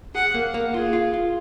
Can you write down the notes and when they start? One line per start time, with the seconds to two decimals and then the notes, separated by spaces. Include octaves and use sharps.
0.15 G#4 F#5
0.34 A#3
0.54 A#3
0.74 F4 G#4
0.93 F4
1.14 F4